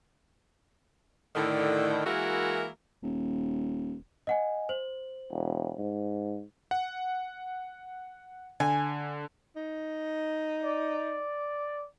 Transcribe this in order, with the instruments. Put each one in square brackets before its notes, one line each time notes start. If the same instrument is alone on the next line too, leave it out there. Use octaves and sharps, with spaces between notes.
[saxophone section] A2 D3 D#3
E3 G#3 A#3 E4 F#4 A#4
[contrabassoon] D#1
[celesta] D#5 F#5 G#5
C5 F#7
[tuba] E1
G#2
[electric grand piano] F#5
[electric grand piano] D3 [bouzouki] G#5
[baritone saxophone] D#4
[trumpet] D5